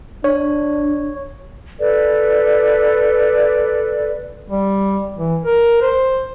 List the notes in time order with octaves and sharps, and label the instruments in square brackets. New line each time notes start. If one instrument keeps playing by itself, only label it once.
[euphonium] D4 [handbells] C#5
[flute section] A4 B4 D5
[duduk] G3
E3
A#4
C5